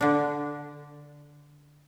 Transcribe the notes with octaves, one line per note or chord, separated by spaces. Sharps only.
D3 D4